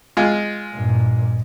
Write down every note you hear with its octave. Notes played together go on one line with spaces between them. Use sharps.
G#3 F4
G2 A#2